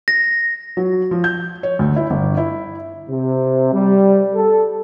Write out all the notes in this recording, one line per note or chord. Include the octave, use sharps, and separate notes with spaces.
A#6
F#3
F3
G6
C#5
D2
E4
G1
E4
C3
G3
A4